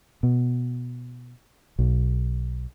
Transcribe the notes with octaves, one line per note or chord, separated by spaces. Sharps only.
B2
B1